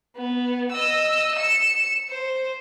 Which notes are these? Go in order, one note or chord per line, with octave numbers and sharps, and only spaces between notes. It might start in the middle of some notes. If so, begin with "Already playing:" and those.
B3
D#5 E6
C#7 E7
C5